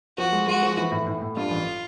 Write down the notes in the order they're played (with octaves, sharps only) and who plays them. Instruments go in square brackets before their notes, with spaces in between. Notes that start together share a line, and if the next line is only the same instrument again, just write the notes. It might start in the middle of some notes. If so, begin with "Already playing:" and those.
[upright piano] F3 [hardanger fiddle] F#4
[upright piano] G#3
[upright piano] G#3 [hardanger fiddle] F#4
[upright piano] F3
E3
A2
A2
A2
[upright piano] G2 [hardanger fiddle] F4
[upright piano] A1